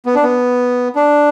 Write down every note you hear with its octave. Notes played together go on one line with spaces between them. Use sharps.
B3
D4
B3
D4